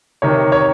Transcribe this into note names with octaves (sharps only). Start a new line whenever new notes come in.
C3 D#3 C#5
C#5